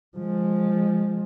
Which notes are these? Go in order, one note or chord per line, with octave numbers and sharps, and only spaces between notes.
F3 G#3